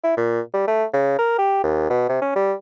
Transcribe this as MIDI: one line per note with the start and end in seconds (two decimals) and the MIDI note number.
0.04 0.14 64
0.17 0.40 46
0.54 0.63 55
0.68 0.85 57
0.93 1.16 49
1.19 1.35 70
1.39 1.60 67
1.64 1.89 39
1.90 2.05 47
2.09 2.22 48
2.22 2.33 61
2.36 2.54 55